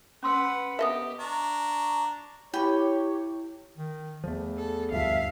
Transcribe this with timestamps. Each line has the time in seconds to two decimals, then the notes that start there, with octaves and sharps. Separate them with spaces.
0.23 C#4 B4 F#5 C6 E6
0.79 B3 G4 D#5 E5
1.20 D4 A#5 C#6
2.53 E4 G4 C#5 G5 B5
3.77 D#3
4.24 E2 F3 A3
4.58 A4
4.91 D2 G2 F3 E5 F5